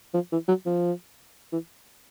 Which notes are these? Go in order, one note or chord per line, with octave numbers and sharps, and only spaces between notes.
F3
E3
F#3
F3
E3